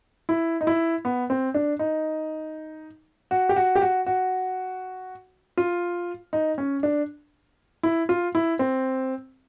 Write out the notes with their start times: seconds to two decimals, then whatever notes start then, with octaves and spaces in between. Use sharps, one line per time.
0.29 E4
0.61 D#4
0.67 E4
1.05 B3
1.30 C4
1.54 D4
1.79 D#4
3.31 F#4
3.49 G4
3.56 F#4
3.75 G4
3.82 F#4
4.06 F#4
5.57 F4
6.33 D#4
6.58 C#4
6.83 D4
7.83 E4
8.09 F4
8.35 E4
8.59 C4